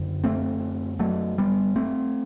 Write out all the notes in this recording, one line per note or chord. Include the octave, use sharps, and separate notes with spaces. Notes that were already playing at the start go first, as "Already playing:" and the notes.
Already playing: F#2 D3
A3 C4
F#3 A3
G3 B3
A3 C4